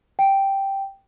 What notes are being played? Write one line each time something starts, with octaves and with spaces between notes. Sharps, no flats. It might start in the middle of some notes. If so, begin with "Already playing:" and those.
G5